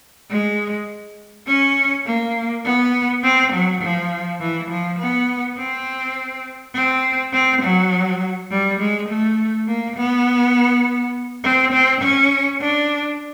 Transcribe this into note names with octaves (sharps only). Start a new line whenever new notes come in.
G#3
C#4
A#3
B3
C4
F#3
F3
E3
F3
B3
C4
C4
C4
F#3
G3
G#3
A3
A#3
B3
C4
C4
C#4
D4